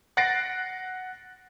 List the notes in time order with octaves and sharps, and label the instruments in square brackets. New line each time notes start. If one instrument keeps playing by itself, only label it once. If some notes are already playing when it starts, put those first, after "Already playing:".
[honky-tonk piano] F#5 F#6 A6 A#6 C7 D7